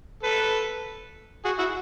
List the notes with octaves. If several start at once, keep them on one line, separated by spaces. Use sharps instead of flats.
A4 B4
F#4 G#4
E4 F#4